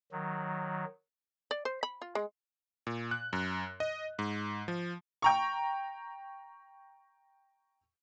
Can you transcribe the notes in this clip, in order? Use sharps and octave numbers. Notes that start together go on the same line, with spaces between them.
D#3 F#3
D5
C5
B5
F4
G#3
A#2
F#6
F#2
D#5
G#2
F3
G5 A#5 C#6